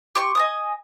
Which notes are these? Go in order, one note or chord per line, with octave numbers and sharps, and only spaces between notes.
G4 C6 C#6
D#5 G#5 D#6